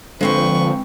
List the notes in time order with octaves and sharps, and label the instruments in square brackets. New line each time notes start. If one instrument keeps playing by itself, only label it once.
[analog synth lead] D3 [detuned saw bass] F3 [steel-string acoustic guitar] G#3 C4 G5 [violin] B4 C#6